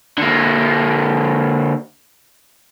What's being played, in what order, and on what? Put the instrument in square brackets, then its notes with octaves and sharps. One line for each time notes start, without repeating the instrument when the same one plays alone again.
[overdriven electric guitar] D3 A#3